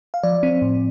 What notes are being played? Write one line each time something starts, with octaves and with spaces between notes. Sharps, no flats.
F5
F3 D5
C4
A2